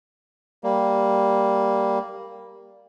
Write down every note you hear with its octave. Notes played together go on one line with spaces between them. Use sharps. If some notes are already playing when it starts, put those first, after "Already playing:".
G3 A#3